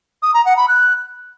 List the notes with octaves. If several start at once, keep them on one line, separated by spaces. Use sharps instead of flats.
D#6
A#5
F#5
B5
F#6